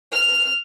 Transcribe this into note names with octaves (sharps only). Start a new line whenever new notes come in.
F6